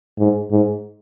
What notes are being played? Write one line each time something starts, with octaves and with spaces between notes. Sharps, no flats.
G#2
G#2